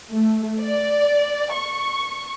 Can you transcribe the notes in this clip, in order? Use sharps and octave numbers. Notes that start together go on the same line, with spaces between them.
A3
D5
C#6